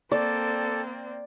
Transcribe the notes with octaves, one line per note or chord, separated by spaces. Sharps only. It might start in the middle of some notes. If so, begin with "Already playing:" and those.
A#3 C4 A4 D5